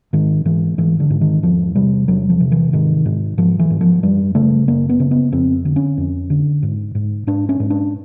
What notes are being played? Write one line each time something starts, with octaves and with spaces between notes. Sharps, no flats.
G#2 D#3
G#2 E3
G#2 E3
D3
G#2
D#3
E2 F3
C3 G3
E2 F#3
F3
C3
E3
G#2 D#3
G#2
G#2 F3
E3
G#2
F3
F#2 G3
C#3 A3
F#2 A#3
B3
C#3
B3
F2 C4
D3
C#4
F2
D3
G#2
G#2
G#2 D4
C#4
G#2
D4